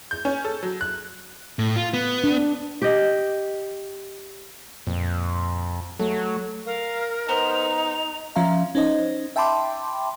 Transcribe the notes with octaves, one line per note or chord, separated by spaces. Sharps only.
G6
C#4
A4
F#3
F#6
A2
F4
B3
D4
G4 D#5
F2 A#2
F#3 A3 A4
A#4 F5
B3 D#4 C5 A#5 F7
F3 C#4 E5 F5 A#5
C#4 D#4 C5 D#5
E5 G5 A5 B5 C6 D6